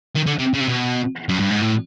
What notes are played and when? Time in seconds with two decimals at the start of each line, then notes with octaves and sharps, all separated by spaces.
0.16 D#3
0.27 D3
0.39 C3
0.54 C#3
0.61 C3
0.68 B2
1.29 F#2
1.40 G2
1.51 G#2
1.62 A2